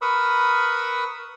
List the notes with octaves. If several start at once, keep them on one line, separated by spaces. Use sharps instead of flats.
A#4 B4 B5 C#6 D#6 E6